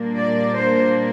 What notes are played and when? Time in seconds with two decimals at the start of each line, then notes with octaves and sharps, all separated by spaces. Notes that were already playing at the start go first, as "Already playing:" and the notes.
Already playing: A#2 G3 A#3 D4
0.17 D5
0.56 C5